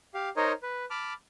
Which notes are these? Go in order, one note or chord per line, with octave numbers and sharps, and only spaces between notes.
G4 F5
D#4 A#4 C5 C#5 D#5
B4
A5 B5 D6 F6